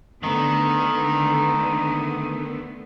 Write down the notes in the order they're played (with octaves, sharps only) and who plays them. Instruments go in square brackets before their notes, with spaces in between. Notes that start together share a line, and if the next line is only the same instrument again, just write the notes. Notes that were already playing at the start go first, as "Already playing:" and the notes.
[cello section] D3 A3 B3 [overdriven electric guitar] D#3